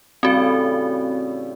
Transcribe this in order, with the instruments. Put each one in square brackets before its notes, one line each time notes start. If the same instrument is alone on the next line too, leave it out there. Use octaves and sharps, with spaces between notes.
[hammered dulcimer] A2 C#3 G3 [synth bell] C4 F#4